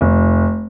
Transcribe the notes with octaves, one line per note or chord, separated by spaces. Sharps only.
F1